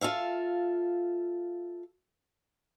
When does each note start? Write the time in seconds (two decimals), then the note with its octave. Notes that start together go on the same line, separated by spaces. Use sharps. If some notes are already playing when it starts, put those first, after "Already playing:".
0.01 F4 A4 E5 F5